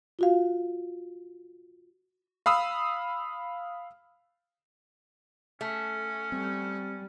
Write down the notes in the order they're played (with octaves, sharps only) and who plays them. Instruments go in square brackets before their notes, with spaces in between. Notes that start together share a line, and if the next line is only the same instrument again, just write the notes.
[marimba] F4 F#4 F5
[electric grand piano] F5 B5 D#6 E6
[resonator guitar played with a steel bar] A3 [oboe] C#4
[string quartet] G3 [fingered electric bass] C4